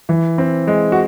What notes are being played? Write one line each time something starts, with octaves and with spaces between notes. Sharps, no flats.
E3
C4
G#3
F#4